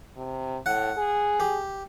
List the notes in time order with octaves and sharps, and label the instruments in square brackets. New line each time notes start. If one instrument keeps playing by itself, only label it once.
[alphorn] C3
[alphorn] A2 [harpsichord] F#5
[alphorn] G#4
[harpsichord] G4